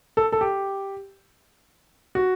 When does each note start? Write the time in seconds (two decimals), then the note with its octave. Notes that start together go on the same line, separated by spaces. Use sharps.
0.17 A4
0.32 A4
0.41 G4
2.15 F#4